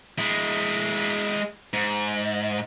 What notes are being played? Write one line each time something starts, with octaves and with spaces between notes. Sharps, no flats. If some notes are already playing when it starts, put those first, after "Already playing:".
G#3 E4
G#2